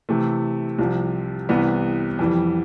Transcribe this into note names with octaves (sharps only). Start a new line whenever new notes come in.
C3 E3 A3
C2 C3 F3
C2 C3 E3 B3
F2 E3 G3